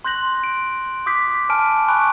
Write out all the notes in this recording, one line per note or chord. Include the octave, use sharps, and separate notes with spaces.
C6 F#6 G6 A#6 F#7
D7
D6 D#6 G6 B6
G#5 A5 F6 D7
G#5 B5 C#6 F#6 D7